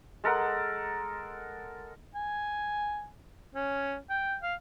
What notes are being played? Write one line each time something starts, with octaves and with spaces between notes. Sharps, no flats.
G#3 A4 A#4 F#5
G#5
C#4
G5
F5